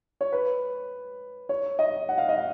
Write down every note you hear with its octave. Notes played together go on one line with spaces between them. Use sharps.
C#5
B4
C#5
D#5
F#5
F5
D#5
F5